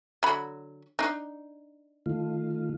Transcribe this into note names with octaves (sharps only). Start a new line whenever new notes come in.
D3 F#3 B5
D4 D#4
D#3 A3 F4